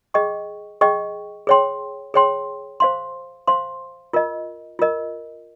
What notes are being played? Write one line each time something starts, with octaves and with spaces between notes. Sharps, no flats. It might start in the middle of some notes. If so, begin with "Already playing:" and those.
G#4 D#5 G5 C#6
G#4 D#5 G5 C#6
G#4 C#5 G5 C6
G#4 C#5 G5 C6
C5 F5 C6
C5 F5 C6
F4 A#4 D#5
F4 A#4 D#5